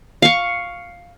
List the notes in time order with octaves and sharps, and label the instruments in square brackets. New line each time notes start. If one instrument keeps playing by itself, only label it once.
[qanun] F5 C#6